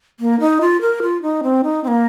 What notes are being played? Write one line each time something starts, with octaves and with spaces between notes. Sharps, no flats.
A#3
D#4
F4
A#4
F4
D#4
C4
D#4
C4
A#3